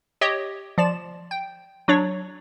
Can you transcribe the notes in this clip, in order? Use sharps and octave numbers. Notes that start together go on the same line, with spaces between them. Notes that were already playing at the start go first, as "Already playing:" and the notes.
G4 C#5 D#5
F3 D5 E7
G5
F#3 D4 C#5